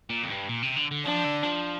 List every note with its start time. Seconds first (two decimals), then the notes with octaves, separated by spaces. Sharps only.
0.10 A#2
0.23 F2
0.30 G2
0.49 A#2
0.63 C3
0.76 D3
0.91 D3
1.05 F3 D4
1.24 D3
1.43 F3